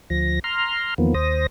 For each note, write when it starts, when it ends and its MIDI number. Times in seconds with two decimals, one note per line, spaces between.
0.10 0.39 38
0.10 0.39 53
0.10 0.39 94
0.44 0.94 82
0.44 0.94 84
0.44 0.94 89
0.98 1.14 40
0.98 1.14 51
0.98 1.14 53
0.98 1.14 58
0.98 1.14 59
1.14 1.46 39
1.14 1.46 72
1.14 1.46 87
1.14 1.46 94